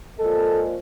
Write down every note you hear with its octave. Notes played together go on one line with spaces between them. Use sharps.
A#2 F3 G#3 A4